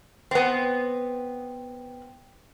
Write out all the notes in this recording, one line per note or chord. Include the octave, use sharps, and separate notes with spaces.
B3 C4